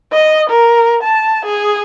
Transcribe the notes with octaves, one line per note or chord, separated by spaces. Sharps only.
D#5
A#4
A5
G#4